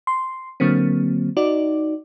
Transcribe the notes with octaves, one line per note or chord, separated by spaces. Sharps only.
C6
D3 F#3 A#3 C4
D#4 F#4 D5